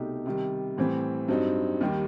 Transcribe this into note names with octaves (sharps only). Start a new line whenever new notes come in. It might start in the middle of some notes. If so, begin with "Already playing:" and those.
Already playing: C2 B2 A3 D#4 G4
C3 D#3 G3
A2 E3 G3 C4
G2 F#3 C4 D#4
D#2 D#3 G3